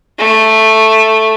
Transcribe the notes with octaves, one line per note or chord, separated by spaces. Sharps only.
A3